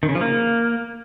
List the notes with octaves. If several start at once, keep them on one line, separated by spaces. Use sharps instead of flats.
D#3
C#3
F3
A#3